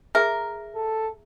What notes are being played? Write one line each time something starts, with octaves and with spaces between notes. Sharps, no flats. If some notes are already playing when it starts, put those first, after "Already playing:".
G#4 A#4 E5 A#5
A4